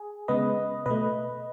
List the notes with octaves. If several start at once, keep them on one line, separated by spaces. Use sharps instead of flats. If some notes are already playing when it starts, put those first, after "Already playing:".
Already playing: G#4
C#3 G#3 B3 B4 D#5
B2 A3 B4 D#5